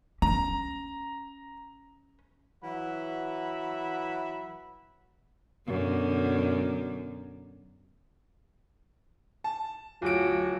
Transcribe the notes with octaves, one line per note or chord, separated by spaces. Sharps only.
C#4 A#5
E3 F#3 E5 F#5 B5
F#2 B2 D3
A5
D1 F#3 F4 D7